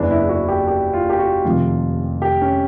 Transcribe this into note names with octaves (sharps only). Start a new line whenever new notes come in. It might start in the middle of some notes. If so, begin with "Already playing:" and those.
Already playing: F#1 E2 C#3 E3 D4
E4
F#4
G4
G4
F4
G4
F#4
F1 F2 C3 D#3 F4
G4
C#4